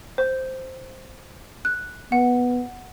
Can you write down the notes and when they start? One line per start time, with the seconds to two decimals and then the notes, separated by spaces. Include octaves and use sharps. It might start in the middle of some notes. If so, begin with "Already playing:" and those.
0.18 C5
1.65 F#6
2.12 B3 F#5